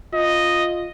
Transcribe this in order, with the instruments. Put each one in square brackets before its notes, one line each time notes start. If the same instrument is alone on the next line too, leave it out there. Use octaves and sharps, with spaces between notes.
[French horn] F4 [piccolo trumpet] D#5